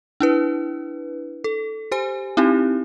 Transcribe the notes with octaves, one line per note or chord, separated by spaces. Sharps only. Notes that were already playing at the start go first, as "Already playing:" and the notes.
D4 E4 B4
A4
G4 C5 G#5
C4 D#4 E4 G4